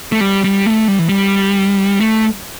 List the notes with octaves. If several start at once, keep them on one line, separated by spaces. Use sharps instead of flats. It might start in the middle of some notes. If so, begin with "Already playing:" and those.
A3
G3
G3
A3
G3
E3
G3
A3